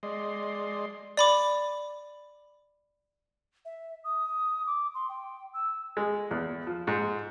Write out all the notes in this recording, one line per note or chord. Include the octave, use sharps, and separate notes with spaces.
G#3 D5 D#5 C6
D5 B5 D6
E5
D#6
D6
C6
G5
E6
G#3
E2
F3
G#2